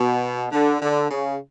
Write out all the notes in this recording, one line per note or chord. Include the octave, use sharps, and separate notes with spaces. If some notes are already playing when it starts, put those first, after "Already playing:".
Already playing: B2
D3
D3
C#3